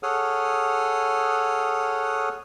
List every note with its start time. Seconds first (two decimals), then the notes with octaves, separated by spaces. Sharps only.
0.03 G#4 A4 C#5 F#5 D#6 F6